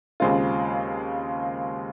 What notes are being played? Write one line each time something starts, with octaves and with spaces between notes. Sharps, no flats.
D#2 C#3 G#3 C4 F4